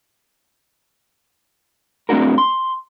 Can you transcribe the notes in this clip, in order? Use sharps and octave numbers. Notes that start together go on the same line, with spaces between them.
A3 C4 D4 F#4 A#4
C6